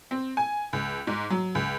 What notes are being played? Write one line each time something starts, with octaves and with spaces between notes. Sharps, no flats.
C4
G#5
C#2
G#2
F#3
C#2